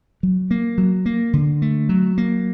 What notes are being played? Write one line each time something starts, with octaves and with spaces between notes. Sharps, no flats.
F#3
A#3
F#3
A#3
D3
A3
F#3
A#3